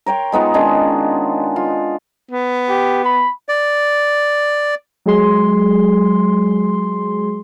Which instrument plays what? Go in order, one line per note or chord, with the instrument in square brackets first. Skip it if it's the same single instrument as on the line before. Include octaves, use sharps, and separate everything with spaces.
[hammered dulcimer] A#4 C#5 G5 C6
G#3 B3 D#4 F4
D#3 G#3 C#4 D4
F4
[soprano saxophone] B3
[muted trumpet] G4
B5
[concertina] D5
[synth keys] F#3 G#3 G#4 C6